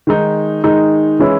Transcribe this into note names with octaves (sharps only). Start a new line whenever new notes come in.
D#3 G#3 D#4
D#3 G#3 D#4
E3 G#3 C#4 E4